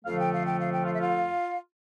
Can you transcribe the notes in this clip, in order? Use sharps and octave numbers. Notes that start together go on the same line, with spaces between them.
F2 D3 F3 A3 F5
G5
F5
G5
F5
G5
F4 F5
E5
F4 F5